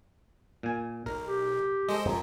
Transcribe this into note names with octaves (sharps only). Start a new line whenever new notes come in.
A#2 G#5
B1 A#4
G4
G#3 A4 C5 D#5
F#2 F3 F#3